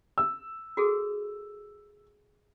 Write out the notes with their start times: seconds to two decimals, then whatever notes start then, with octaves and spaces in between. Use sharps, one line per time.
0.18 E6
0.77 F#4 G#4 A4